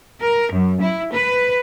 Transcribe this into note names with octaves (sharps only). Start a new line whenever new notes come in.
A#4
F#2
E4
B4